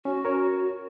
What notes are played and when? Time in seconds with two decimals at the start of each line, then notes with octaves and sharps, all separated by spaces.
0.05 C#4 F#4
0.25 A#4 C#5